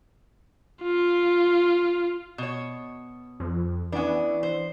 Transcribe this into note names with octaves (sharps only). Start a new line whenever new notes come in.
F4
B2 C#5
F2
E3 B3 C#4 D4
C5